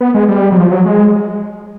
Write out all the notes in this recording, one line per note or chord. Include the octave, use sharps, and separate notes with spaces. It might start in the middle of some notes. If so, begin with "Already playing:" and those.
B3
G#3
G3
F#3
F3
F#3
G#3